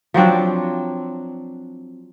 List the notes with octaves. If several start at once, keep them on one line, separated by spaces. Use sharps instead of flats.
F3 F#3 C4 D4